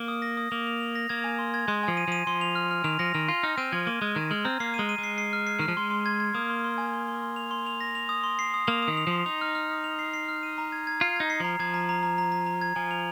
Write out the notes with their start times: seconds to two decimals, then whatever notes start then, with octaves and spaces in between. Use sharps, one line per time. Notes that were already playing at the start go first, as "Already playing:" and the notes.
Already playing: A#3
0.08 D#6
0.22 A#6
0.37 D#6
0.52 A#3 F7
0.67 F7
0.80 F7
0.95 A#6
1.09 A#3 G#6
1.24 G#5
1.39 C6
1.54 G#6
1.68 G#3 C6
1.83 F3 G#5
1.97 D#7
2.08 F3 D#7
2.27 F3 C6
2.41 F7
2.55 F6
2.71 F6
2.84 D#3 F7
2.99 F3 A#6
3.14 D#3 F7
3.28 F4 C6
3.43 D#4 F6
3.58 C4 D#7
3.72 F3 G#6
3.87 A#3 D#7
4.02 G#3 G#6
4.16 D#3 G#6
4.31 G#3 F6
4.45 C4 A#5
4.60 A#3 C7
4.74 D#7
4.79 G#3
4.89 D#7
4.98 G#3
5.03 C7
5.18 C7
5.33 F6
5.47 C7
5.59 D#3 F6
5.68 F3
5.77 G#3 C6
5.91 C6
6.06 G#6
6.20 G#6
6.35 A#3 D#6
6.50 C6
6.64 C6
6.78 G#5
6.93 C6
7.08 C6
7.22 C6
7.36 F7
7.51 C6
7.66 F7
7.81 A#6
7.95 F7
8.09 D#6
8.24 C6
8.39 C7
8.54 D#6
8.67 A#3 F7
8.83 D#6
8.88 D#3
8.97 F7
9.07 F3 C6
9.26 D#4 F7
9.41 F6
9.55 F6
9.69 F6
9.84 F7
9.99 C7
10.14 C7
10.28 F6
10.43 D#7
10.58 A#5
10.72 G#6
10.87 G#6
11.01 F4 C7
11.16 D#4 G#6
11.30 C7
11.40 F3 A#5
11.59 F3 G#6
11.74 A#5
11.89 A#5
12.03 A#5
12.18 A#5
12.32 A#5
12.46 A#5
12.61 G#6
12.76 F3 G#5
12.91 F7